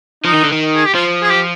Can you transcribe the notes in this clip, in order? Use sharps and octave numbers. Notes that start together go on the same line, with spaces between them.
F3 D#4
D#3
D3
D#3
G#4
G4
F3 F4
G#4
G4